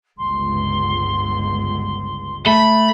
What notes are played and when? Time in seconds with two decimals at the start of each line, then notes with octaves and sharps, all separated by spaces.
0.18 G1 C#2 C6
2.46 A3 B5